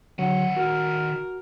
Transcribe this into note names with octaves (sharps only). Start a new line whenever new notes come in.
D3 D#3 F#3 C#5 F#5
F#4 A#4